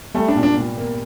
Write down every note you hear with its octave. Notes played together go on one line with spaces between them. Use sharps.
G3 A3
D4
A#2
D4
A#2
A#3